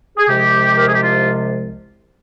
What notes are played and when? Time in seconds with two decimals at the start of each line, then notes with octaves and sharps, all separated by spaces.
0.17 G#4
0.28 C2 C3 F3 G#3 G4
0.78 A#4
0.86 G#4
0.94 G4
1.03 F4